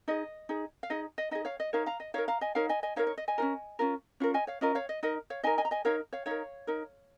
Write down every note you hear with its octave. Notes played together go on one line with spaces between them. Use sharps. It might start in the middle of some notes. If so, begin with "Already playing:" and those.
D#4 G#4 D#5
D#4 G#4
F5
D#4 G#4 D#5
D#5
D#4 G#4 D#5
C#5 F5
D#5
D#4 A#4 C#5 F5
F5 A#5
D#5
D#4 A#4 C#5 F5
F5 A#5
D#5 G#5
D#4 A#4 C#5 F5
D#5 G#5
D#5 G#5
D#4 A#4 C#5 F5
C#5
D#5
D#5 G#5
C#4 F4 A#4
C#4 F4 A#4
C#4 F4 A#4
D#5 G#5
C#5 F5
C#4 F4 A#4 D#5
C#5 F5
D#5
D#4 A#4 D#5
C#5 F5
D#4 A#4 D#5 G#5
D#5 G#5
A#5
D#5 G#5
D#4 A#4 C#5 F5
C#5 F5
D#4 A#4 C#5 F5
D#4 A#4